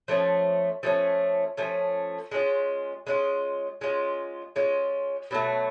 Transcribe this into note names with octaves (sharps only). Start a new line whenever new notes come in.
F3 A3 C#4
F3 A3 C#4
F3 A3 C#4
G#3 C#4 F4
G#3 C#4 F4
G#3 C#4 F4
G#3 C#4 F4
B2 F#3 A3